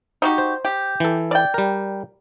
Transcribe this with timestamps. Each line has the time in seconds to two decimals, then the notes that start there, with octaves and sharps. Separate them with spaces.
0.22 D#4 F#4 G4
0.38 C5
0.65 G4
1.00 E3 A4
1.31 D5 G5
1.54 G3 A#4